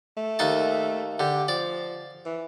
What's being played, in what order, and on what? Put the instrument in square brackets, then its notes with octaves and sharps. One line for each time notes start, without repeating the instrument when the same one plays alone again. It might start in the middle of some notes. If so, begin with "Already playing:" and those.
[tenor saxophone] A3
[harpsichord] D#2 D#4 A5
[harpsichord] D3 [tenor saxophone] G4
[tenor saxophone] F3 [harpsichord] D5
[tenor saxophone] E3